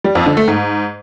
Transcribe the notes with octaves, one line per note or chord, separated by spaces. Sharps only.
G3
F2
D3
A3
G#2